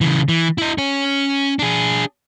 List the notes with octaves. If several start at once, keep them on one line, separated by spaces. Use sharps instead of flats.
C#3 E3
E3
E4 D#5
C#4 C#5
D4 G#4